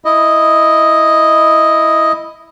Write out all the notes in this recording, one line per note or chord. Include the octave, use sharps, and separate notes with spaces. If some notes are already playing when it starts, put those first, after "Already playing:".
E4 D#5